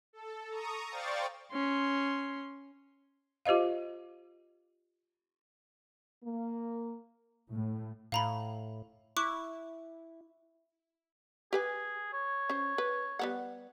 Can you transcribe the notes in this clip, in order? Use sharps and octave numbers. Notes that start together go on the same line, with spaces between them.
A4
A#5 C#6 D#6
C5 D5 F5 G5 C#6 A6
C#4 C6
F4 G4 C5 D#5 F5
A#3
A2
A2 F5 A#5 B5
E4 C#6 D6 F#6
G4 G#4 B4 G#5
C#5
C#4 C5
B4
G3 B3 F#5